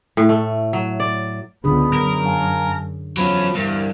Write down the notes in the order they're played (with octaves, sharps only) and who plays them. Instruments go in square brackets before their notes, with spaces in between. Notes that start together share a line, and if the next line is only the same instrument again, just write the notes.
[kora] A2
A3
F#3
D5
[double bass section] C#2 B3 [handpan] D3 D4 G#4 [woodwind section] B5 D#6
[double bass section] F#2 [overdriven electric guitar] A#4
[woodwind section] F5 G#5 A5
[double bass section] E2 [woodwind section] F3 B5 [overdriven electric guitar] F#3 C#4
[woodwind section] C2 [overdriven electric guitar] G2